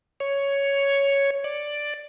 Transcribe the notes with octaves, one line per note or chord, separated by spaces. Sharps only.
C#5
D5